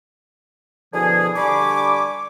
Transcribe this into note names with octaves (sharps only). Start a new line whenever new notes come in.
B2 D3 F3 E4 G#4
D3 G3 G#5 B5 C#6 D6